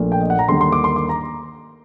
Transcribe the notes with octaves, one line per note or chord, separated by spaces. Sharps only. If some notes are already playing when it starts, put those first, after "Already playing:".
Already playing: A#1 A#2 A3
G5
D#5
F#5
A#5
D#2 D3 G3 A#3 C6
C6
D6
C6
D6
A#5